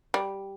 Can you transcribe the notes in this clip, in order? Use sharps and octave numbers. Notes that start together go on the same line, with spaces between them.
G3